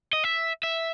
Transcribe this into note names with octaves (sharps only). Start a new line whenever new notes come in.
D#5
E5
E5